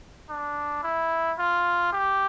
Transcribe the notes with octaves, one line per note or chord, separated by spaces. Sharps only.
D4
E4
F4
G4